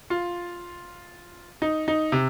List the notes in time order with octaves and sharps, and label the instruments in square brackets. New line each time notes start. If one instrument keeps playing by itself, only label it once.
[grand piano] F4
D#4
D#4
C3